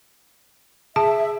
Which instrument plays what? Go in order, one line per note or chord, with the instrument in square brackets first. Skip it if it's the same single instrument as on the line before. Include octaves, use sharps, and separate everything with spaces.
[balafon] G#4 A5 [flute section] E5